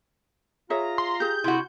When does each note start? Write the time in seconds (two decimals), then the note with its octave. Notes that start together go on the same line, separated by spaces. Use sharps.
0.70 F4 G#4 C#5 E5 A#5
0.98 C6
1.20 G4 G#4 G6
1.44 C3 E4 F#4